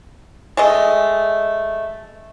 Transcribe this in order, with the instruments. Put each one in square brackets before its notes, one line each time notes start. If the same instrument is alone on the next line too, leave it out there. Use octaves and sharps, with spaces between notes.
[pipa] G#3 A3 D#5